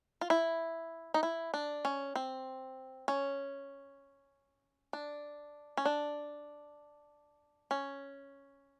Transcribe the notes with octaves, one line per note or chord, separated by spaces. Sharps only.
F4
E4
D#4
E4
D4
C#4
C4
C#4
D4
C#4
D4
C#4